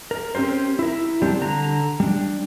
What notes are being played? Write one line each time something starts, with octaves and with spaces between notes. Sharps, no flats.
A#4
C4 C#4 G4 A#4 C5
E4 A#4
G3 C4 D4 G4
D3 A#5
G3 D4